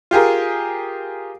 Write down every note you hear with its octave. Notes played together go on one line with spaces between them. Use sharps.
F4 G4 G#4 A#4